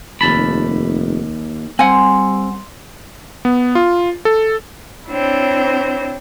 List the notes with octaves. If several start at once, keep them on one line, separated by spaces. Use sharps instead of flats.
F1 D#2 A5 B5
G3 C4 F#5 G#5 C6
B3
F4
A4
C4 D4 E4 C5 C#5